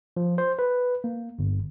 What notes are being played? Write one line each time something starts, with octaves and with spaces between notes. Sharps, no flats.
F3
C5
B4
A#3
G1